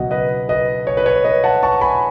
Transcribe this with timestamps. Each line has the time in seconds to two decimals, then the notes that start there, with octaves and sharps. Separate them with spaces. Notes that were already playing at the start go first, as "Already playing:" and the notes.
Already playing: C#2 B2 F#3 D#5 F#5
0.11 B4 D#5
0.49 B4 D#5
0.87 C#5
0.97 B4
1.06 C#5
1.24 B4 D#5
1.44 F#5 A5
1.63 A5 C#6
1.81 G#5 B5